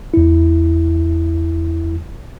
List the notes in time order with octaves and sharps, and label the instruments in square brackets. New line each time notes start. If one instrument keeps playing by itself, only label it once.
[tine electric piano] E2 E4